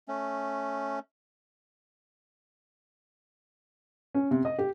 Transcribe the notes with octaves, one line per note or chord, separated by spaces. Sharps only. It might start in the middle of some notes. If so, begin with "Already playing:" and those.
A3 C#4
C#4
C3
D#5
G4